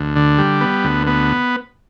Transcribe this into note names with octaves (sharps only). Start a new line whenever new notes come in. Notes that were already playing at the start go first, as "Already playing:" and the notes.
Already playing: D2
D3
G3
B3
D2
B3